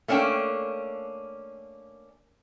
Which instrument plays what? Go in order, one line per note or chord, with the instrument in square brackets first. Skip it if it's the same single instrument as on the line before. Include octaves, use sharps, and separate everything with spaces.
[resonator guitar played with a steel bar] A3 A#3 C#4 D4 G5